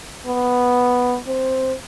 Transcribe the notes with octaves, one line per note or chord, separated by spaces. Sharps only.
B3
C4